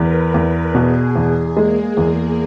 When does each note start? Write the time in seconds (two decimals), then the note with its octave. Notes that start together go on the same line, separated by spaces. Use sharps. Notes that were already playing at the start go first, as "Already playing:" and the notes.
Already playing: E2 A#4 B4
0.34 E2
0.75 B2 G#4
1.16 E2
1.56 G#3 A#3
1.97 E2